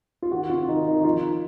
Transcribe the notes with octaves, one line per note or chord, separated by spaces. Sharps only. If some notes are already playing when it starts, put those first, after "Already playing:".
F4
D#3 F#4
C3 F4
D#3 D#4
D#3 D#4
D#4
F3 F4
F3